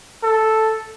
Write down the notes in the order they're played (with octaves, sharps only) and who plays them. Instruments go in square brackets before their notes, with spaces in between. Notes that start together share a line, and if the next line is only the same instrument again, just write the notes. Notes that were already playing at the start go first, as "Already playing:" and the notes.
[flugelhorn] A4